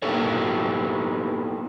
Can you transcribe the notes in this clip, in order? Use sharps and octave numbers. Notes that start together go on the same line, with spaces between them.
A#3 B3 D#4 G4 A4 C#5